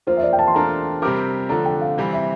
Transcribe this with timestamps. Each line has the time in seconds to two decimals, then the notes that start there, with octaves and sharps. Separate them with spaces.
0.07 F3 A#3 F4 C5
0.17 E5
0.23 D5
0.33 G5
0.39 A5
0.47 C6
0.54 A3 D4 F4 A#4 A#5
1.02 C3 G3 C4 G4 A#4 D6
1.49 D3 F3 A3 D4 A#5
1.65 G5
1.81 F5
1.98 C3 E3 G3 C4
2.13 E5